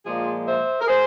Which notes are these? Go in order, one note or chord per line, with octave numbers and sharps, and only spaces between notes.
A#2 F3 G#3 F4 G#4
C5 E5
A#4
G#4 C5